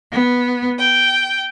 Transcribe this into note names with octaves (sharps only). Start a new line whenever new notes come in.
B3
G5